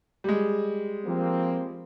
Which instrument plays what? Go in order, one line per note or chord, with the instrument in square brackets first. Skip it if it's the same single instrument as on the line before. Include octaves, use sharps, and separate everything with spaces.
[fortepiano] G3 G#3
[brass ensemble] F3 A#3 C4